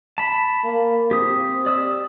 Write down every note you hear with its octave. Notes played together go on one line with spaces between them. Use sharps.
A5 B5
A#3
C4 G4 D#6
D5 D#6 E6